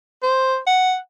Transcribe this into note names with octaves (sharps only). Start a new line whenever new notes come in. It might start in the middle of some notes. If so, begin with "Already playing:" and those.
C5
F#5